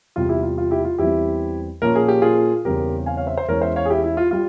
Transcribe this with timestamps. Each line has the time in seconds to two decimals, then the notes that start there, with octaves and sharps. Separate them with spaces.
0.16 E2 C3 G3 F4
0.29 E4 G4
0.43 F4
0.58 F4
0.71 E4 G4
0.85 F4
0.98 E2 E3 G3 C4 E4 G4
1.82 A#2 F3 A#3 C#4 A#4
1.95 G#4
2.08 G4
2.22 F4 G#4
2.65 E2 C#3 G3 C4 G4 A#4
3.06 F5 G#5
3.17 C#5 F5
3.27 C5 E5
3.37 C5 E5
3.48 E2 E3 G#3 C#4 A#4 C#5
3.62 C5 E5
3.76 C#5 F5
3.86 G#4
3.90 E4 G4
4.04 E4
4.17 F4
4.31 G3 F4